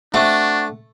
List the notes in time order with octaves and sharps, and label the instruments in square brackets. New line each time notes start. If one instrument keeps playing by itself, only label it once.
[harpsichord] A3 [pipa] C4 F#4 [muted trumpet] D4